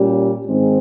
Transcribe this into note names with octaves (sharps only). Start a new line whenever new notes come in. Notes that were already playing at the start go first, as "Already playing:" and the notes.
Already playing: A#2 G3 C#4 G4
G#2 D#3 G#3 C4